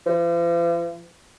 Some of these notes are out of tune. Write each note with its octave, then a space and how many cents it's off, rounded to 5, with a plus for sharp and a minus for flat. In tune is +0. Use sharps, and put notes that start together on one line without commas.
F3 -45